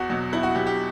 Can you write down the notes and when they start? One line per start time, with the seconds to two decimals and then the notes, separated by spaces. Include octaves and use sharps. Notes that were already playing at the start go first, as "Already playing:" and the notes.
Already playing: E2 F#4
0.10 B2 F#3
0.32 E2 E4
0.43 F#4
0.55 B2 F#3 G4
0.67 G4